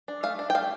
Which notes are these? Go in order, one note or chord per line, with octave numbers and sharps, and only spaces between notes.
D4
A3 F5
D4
G5
A3 F5